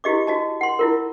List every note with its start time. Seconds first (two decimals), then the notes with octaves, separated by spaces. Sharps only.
0.04 E4 F#4 G4 D#5 D6
0.27 F#4 D#5 A5
0.61 F#5 C6
0.79 E4 F4 A#4